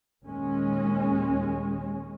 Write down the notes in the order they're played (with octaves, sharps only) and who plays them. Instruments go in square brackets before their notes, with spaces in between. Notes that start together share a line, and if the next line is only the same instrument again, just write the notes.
[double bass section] D#2 A#2 G#3 C#4